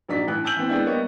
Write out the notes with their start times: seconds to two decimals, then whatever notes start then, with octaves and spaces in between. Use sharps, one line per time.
0.09 A#1 F#3 D4 D#4 B6
0.27 A1 F#6
0.44 G#5 A5 E6 G6 F#7
0.57 E3 B3 C4
0.69 G#3 B3 C4 D4 E4
0.86 G3 A#3 B3 C#5 D#5